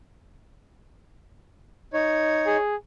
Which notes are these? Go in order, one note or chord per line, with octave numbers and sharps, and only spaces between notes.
D#4 C#5
G#4